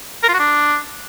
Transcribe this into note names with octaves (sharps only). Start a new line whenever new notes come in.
A#4
F4
F#4
D4